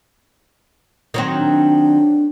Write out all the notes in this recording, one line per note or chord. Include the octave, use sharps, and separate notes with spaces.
D#3 F#3 C4
D4